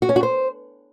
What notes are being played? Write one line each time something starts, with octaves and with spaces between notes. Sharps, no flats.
F#4
C#4
F#4
C5